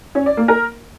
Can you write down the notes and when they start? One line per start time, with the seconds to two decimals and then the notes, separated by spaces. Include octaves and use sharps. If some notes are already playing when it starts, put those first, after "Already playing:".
0.15 C#4
0.26 D5
0.37 A#3
0.48 A#4